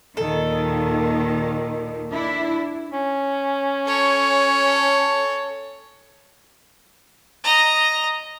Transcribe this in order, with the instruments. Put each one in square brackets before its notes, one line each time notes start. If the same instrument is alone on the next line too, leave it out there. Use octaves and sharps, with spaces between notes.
[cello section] D#2 A#2 D#3 [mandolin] A4
[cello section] D4 E4
[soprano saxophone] C#4
[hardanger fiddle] A4 C#5
D#5 A#5